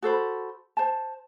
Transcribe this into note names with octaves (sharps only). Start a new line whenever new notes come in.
F#4 A4 C5 B5
C5 A5